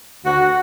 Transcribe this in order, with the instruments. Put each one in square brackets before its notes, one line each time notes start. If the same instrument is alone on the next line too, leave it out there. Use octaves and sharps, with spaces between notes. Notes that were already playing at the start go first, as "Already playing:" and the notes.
[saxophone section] D2 F#4